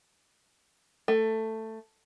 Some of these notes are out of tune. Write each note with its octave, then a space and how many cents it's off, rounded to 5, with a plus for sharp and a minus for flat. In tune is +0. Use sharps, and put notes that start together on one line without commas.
A3 +10